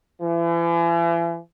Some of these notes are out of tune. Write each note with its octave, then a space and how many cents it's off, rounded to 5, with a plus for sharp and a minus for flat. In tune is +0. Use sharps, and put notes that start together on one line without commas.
E3 +40